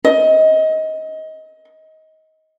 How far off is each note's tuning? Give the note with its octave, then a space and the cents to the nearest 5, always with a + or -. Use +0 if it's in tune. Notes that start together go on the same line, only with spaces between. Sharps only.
D#5 +20